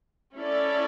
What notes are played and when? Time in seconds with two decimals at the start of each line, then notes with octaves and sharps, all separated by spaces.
0.36 C#4 E4 A4 D5